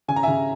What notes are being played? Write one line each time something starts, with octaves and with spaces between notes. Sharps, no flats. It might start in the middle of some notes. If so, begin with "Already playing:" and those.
C#3 G#5
A#5
C#3 E5 G#5